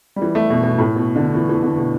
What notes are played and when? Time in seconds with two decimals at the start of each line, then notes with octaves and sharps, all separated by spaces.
0.16 G3
0.22 E3
0.35 A3
0.50 B2
0.63 B2
0.78 A2
0.96 B2
1.16 D3
1.35 E3
1.49 E3
1.63 D3
1.77 B2